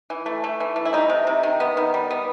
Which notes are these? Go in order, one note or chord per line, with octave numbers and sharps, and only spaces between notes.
E3
A3
A3
E3
A3
E4
G3 D#4
C3
C3
D#3
B3
D#3
G3
B3